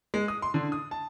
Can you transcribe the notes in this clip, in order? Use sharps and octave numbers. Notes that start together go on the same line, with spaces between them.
G#3
D#6
C6
D3
D#6
A5